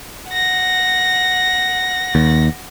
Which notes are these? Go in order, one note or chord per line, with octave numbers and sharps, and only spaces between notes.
F#5 A#6
D#2